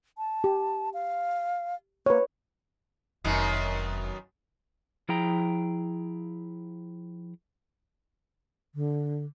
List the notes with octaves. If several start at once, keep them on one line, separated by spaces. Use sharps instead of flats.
A5
G4
F5
A#3 B4 C#5
F1 F#2 D#3 B3
F3 E4 G#4 G5 A#5
D3